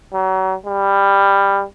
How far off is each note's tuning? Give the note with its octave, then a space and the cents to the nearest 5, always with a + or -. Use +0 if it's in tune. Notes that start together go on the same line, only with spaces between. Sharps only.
F#3 +35
G3 +15